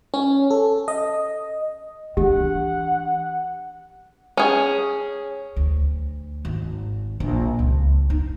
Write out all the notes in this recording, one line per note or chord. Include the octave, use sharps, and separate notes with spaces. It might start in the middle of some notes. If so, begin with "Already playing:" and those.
C#4
A4
D#5
E3 D4 G4 F#5
C#4 G#4
D2
G#1
A#1
C#2
D#4